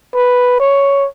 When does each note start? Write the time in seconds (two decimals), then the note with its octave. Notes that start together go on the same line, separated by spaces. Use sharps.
0.14 B4
0.60 C#5